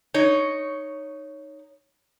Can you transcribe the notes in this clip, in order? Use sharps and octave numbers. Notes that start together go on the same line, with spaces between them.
D#4 C#5